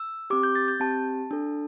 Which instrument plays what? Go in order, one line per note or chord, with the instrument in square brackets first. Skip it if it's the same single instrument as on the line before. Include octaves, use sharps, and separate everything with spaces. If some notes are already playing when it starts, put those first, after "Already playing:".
Already playing: [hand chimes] E6
C4 G4 D6
G6
A6
G6
C4 G4 A5
D4 A4